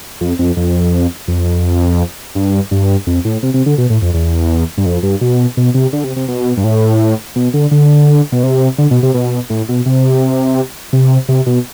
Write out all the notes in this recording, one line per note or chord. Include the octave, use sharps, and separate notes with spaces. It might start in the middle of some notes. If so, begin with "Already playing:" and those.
F2
F2
F2
F2
G2
G2
F2
A2
C3
C3
D3
B2
A2
F2
E2
G2
F2
G2
B2
B2
C3
D3
C3
C3
B2
G2
A2
B2
D3
D3
B2
C3
D3
B2
C3
B2
A2
B2
C3
C3
C3
B2